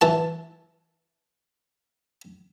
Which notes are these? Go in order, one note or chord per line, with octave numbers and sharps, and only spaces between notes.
E3 A5